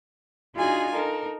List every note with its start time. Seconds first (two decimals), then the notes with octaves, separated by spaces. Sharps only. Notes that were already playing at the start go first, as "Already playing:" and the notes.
0.54 D4 D#4 F4 F#4 G#4 G#5
0.91 D#4 A4 A#4